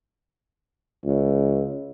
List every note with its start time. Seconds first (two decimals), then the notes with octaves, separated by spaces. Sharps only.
1.05 C#2